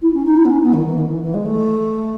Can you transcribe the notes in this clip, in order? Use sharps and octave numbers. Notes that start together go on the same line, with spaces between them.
E4
C#4
D#4
E4
B3
C#4
B3
D#3
E3
D#3
E3
E3
G#3
A3